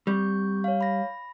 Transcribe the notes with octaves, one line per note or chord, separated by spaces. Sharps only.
G3 C4 C#6 G6
C#5 F5
B5 A#6